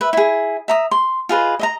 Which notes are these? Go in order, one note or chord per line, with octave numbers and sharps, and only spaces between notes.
B4 E5
E4 G#4
E5 A#5 D#6
C6
F4 G#4 B4 D#5
D#5 E5 A#5